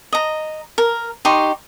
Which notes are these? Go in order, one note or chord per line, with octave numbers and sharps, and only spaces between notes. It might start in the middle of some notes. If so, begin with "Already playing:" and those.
D#5 A#5
A#4
D#4 G4 C6 C#6